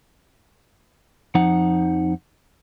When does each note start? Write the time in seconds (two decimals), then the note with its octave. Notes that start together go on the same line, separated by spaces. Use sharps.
1.35 F2 F3 D#4 F#5